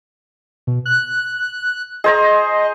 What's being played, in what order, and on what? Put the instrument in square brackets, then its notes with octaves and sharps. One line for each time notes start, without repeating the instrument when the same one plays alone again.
[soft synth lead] B2
F#6
[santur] G#4 C5 A#5 [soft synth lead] D#5